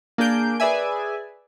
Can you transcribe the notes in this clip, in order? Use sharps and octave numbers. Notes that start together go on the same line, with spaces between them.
A#3 D4 G#4 G6 D7
G#4 B4 D5 E5 G#5